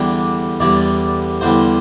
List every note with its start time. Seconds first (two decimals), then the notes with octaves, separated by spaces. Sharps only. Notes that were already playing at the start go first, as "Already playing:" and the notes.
Already playing: E2 D3 G3 D4
0.60 E2 D3 G3 D5
1.41 E2 D3 G3 C5